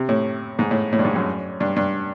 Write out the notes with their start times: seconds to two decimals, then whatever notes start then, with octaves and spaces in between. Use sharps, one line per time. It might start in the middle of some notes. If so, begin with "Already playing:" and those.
Already playing: C3
0.09 A2
0.59 G#2
0.71 A2
0.92 A2
0.99 G2
1.04 G#2
1.15 F#2
1.60 G2
1.76 G2